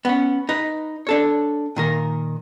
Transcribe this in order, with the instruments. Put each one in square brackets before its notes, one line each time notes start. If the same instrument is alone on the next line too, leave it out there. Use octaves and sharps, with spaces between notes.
[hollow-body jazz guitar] B3 C#4
D#4 B4
D4 A4 C#5
A#2 D#3 A#4